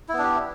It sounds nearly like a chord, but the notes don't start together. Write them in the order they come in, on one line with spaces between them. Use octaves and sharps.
E4 B3 D4 G4